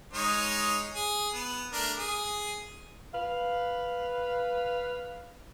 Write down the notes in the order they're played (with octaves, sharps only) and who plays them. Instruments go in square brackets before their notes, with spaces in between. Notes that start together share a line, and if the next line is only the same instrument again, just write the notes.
[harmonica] G#3 D#4 C#5
G#4
B3
A3 D4 A#4
G#4
[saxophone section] B4 F5